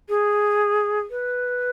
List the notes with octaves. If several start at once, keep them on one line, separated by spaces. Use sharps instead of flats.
G#4
B4